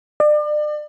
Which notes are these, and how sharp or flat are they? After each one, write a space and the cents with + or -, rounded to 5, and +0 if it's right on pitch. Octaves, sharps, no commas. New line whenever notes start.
D5 +35